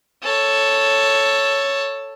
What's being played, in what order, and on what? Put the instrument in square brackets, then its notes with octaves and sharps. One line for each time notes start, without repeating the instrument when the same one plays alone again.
[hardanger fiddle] A4 C#5